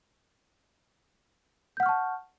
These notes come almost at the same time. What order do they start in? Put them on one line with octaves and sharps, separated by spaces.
G6 F#5 F6 C#6 A5